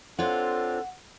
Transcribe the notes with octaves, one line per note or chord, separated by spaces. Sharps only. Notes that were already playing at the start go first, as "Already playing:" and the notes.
C4 D4 F4 A4 C#5 F#5 G5